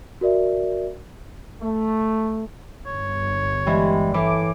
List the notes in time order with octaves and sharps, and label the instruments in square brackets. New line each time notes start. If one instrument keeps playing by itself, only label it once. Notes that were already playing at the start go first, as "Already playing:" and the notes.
[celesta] F#4 A#4 D5 E5
[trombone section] A3
[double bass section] G1 [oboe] C#5
[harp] E3 [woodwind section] G3 G#3
[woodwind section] A2 D6 [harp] E3